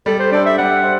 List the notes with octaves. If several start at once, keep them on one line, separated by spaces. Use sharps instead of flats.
G3 A4
C5
D4 A4 C5 D5
E5
G3 F#5
C5